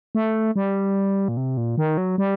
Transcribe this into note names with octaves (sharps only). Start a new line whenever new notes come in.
A3
G3
A#2
C3
A#2
D#3
F#3
G3